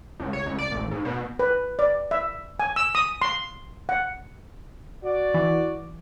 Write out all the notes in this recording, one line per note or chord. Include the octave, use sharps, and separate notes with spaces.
C#2
C#5
C#2
D5
A1
G#2
B2
B4
D5
E5
G#5
E6
D#6
C6
F#5
F#4 D5
E3